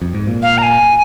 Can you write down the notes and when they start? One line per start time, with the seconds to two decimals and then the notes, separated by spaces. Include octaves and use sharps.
0.02 F2
0.14 G#2
0.27 A#2
0.42 F5
0.58 A#5
0.63 G#5